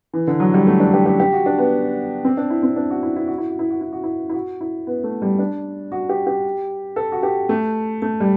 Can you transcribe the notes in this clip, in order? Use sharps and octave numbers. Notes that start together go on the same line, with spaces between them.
E3
D3
F#3
G3
A3
D4
G4
G4
G4
F#4
D4
B3
C4
D4
E4
C4
D4
F#4
E4
E4
F#4
E4
F#4
E4
F#4
E4
F#4
E4
E4
F#4
E4
B3
A3
G3
D4
F#4
G4
G4
A4
F#4
G4
A3
A3
G3